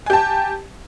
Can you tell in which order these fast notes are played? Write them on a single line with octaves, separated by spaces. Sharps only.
G#5 G4 A5